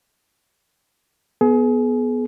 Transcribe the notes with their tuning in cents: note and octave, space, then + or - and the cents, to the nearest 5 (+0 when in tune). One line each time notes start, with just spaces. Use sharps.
B3 -5 G#4 +30